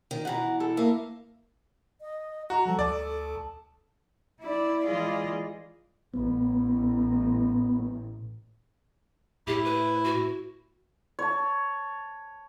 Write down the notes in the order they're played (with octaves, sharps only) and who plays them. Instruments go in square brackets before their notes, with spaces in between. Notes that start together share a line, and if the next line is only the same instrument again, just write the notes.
[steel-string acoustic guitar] D#3
[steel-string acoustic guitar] B2 E3 [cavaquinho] F#5 A#5
[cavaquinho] A4
[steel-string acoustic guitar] A#3 [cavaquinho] E5
[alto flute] D#5
[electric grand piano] F#4 [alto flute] A#5
[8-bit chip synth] F3 G3 [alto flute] A4
[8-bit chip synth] D2 A5 [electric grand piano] D5
[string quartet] E4 D5
E3 G#3 F4 G#4 D5 D#5
[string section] A1 [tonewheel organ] B3
[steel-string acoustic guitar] A2 [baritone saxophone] E4 [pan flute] G4
[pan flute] B4
F#4
[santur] C#5 A5